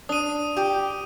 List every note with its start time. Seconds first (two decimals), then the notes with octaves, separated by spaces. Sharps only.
0.09 D4 D#6 D#7
0.57 G4